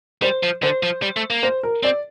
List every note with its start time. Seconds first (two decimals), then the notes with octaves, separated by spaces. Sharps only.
0.22 G3 C5
0.43 F3
0.63 D3 C5
0.83 F3
1.02 G3
1.16 A3
1.30 A#3
1.43 C5
1.63 A#4
1.83 C4 D5